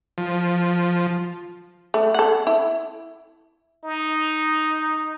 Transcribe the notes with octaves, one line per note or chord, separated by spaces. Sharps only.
F3
A3
A4 F#5
E4
D#4